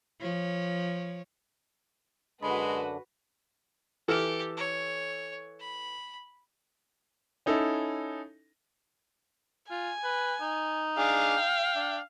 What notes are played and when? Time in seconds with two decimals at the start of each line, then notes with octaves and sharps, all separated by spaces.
0.20 F3 C#5
2.43 F#2 D3 G#3 D4 F#4 B4 B5
4.08 E3 G4 A4 F6
4.57 C#5
5.59 B5
7.46 C#4 D#4 E4 A4
9.71 F4 G#5
10.04 B4
10.42 D#4
10.98 D4 G#4 F5 D6
11.37 G5
11.76 D4